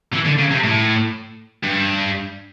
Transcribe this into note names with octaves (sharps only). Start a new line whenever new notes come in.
E3
D3
C#3
C3
A2
G2